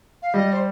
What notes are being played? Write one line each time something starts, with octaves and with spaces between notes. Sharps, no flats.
F5
G3 D#5
C5